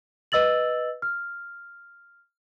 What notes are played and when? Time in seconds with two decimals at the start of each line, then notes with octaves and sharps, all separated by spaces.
0.32 B4 D#5 E6 A6 F#7
1.02 F6